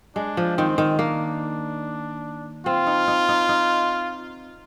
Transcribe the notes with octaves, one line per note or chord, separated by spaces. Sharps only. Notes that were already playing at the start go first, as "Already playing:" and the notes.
G#3 D4
F3
D#3 C4
D#3
A#3 D4
C4 F4
D#4
D#4
D#4
D#4